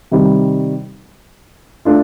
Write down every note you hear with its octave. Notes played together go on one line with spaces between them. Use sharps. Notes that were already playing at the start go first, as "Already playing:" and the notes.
C3 D#3 G3
A3 D4 F4